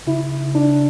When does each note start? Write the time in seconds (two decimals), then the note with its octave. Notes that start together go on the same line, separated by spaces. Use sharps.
0.07 C#3 E4
0.55 D4